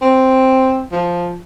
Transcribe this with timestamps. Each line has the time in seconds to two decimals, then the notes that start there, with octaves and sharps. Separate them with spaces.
0.01 C4
0.92 F3